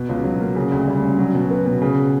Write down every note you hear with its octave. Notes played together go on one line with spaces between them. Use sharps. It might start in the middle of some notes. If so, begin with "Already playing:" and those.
Already playing: B2
C#2
F#3
A#3
C#3
D2
G3
C#4
F#3
B2
B3
B2
C#3